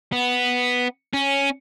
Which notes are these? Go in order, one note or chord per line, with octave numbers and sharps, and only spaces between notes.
B3
C#4